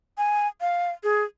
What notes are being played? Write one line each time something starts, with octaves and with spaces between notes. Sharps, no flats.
G#5
F5
G#4